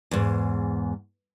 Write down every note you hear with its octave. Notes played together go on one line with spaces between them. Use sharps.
E2 G#2